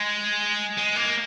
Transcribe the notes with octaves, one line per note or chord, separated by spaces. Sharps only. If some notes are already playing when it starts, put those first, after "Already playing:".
Already playing: G#3
G#3
A#3